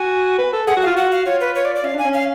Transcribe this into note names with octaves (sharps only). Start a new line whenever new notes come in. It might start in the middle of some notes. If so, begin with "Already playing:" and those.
Already playing: F#4 G#5
B4
A4
G#4 F#5
F#4
F5
F4
F#4 F#5
F5
F4 C#5
B4
C#5
D5
D5
C#4 F5
D4 G#5
C#4
F5